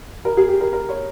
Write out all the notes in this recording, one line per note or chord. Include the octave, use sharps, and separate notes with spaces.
A#4
G#4
G4
A#4
A#4
C#5